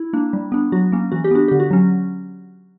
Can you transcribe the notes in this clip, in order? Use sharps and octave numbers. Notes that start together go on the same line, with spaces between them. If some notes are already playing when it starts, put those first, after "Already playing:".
Already playing: E4
A#3 D4
G3
B3 D4
F#3 F#4
A#3 C#4
E3 F#4
G4
B3 D4 F#4
D3 G4
F#4
F#3 C#4